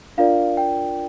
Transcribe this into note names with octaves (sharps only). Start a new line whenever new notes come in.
D4 F4 A#4 D5 F5
G5